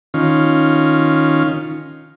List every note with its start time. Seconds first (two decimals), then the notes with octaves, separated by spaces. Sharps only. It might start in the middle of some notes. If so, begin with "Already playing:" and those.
0.14 D#3 C#4 F4